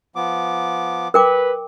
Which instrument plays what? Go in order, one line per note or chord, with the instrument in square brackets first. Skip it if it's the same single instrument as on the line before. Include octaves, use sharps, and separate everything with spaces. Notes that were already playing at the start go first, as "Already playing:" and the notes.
[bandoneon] F3 B3 D6
[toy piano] A#4 G5 D6 [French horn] B4